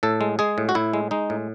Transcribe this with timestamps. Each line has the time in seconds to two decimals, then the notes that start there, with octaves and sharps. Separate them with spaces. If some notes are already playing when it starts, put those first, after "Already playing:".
0.03 A2 A4
0.21 G#3
0.39 G#3 G#4
0.58 A2
0.69 F#4
0.75 A2 E4
0.93 G#3
1.11 G#3 D#4
1.30 A2